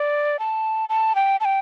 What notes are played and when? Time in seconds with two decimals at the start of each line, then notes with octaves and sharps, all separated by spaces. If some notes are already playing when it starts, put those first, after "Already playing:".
Already playing: D5
0.39 A5
0.89 A5
1.15 G5
1.40 A5
1.45 G5